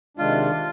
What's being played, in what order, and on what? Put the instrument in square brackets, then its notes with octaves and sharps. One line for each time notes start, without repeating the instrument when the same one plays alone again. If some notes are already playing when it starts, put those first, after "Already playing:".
[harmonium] C3 D#3 G#3 D4 [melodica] F4